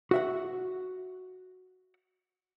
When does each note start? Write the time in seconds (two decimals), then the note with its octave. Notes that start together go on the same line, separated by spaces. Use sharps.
0.11 F#4 E5 F#5